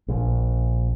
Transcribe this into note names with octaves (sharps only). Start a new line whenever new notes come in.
A#1